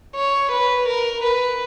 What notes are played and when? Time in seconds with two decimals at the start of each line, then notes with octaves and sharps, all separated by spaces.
0.16 C#5
0.52 B4
0.88 A#4
1.23 B4